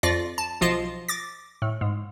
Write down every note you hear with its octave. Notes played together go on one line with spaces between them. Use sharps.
F2 F4 D5 A#6
A5
B1 F3 F4 D#5 E7
D6 A6 A#6
A2
G#2